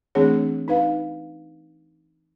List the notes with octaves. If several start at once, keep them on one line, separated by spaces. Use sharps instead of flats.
E3 A3 C4 D4 G#4 C#5
D#4 B4 F5